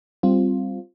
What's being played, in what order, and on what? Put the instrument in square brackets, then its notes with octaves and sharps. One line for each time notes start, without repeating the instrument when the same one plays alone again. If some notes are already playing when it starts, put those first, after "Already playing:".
[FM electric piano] G3 C4 F4